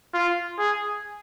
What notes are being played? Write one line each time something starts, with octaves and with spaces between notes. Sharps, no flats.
F4
G#4